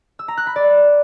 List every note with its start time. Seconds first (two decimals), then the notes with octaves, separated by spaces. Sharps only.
0.19 E6
0.28 A#5
0.37 F#6
0.47 B5
0.56 D5